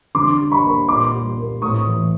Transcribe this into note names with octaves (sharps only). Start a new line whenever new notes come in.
D3 C6 D6
G3
B5 C#6
A#3
A#2 C6 D6
G3
A#3
A2 C#6 D#6
E3